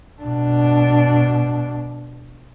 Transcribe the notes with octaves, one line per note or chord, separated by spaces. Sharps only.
B2 D4